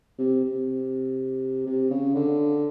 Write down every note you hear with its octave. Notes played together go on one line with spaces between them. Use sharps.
C3
C3
C3
C#3
D3